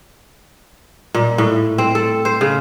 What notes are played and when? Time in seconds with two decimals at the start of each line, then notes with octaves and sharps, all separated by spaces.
1.14 A#2
1.38 A2
1.78 C4
1.95 A4
2.25 C5
2.41 C#3